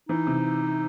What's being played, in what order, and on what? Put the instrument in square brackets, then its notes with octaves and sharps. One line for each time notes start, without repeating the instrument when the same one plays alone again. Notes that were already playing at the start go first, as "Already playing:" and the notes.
[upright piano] E3 [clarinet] D#4
[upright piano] C3